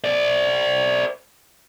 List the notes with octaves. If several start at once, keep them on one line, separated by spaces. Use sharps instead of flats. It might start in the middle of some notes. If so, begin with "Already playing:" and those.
C5 D5